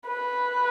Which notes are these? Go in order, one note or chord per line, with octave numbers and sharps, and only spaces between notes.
B4